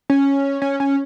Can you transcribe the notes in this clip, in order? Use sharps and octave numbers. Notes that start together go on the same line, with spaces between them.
C#4
C#4
C#4